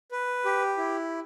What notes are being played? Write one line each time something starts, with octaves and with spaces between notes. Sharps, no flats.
B4
G4
E4